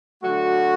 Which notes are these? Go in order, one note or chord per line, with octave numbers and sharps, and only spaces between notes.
D3 F#3 A3 F#4